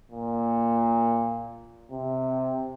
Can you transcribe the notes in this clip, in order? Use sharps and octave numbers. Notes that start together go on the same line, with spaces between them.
A#2
C3